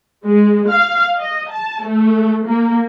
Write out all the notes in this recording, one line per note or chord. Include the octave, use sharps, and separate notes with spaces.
G#3
F5
D#5
A5
A3
A#3